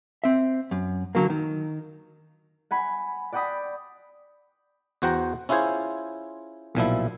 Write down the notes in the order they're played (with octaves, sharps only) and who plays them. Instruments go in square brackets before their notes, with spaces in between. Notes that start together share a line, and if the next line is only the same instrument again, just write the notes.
[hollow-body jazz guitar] C4 E5
F#2
D3 F#3 A#3
D#3
[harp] F#5 G#5 B5
D5 F#5 G5 B5 D#6 B6
[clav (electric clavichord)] E2 F#4 C5 F#5 G5 A#5
C#4 E4 F4 G#4 C5 C#5
B1 A#2 F3 E4